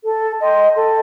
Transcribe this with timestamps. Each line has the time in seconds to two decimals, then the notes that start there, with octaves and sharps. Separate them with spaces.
0.04 A4
0.40 D#5 G5 C6
0.75 A4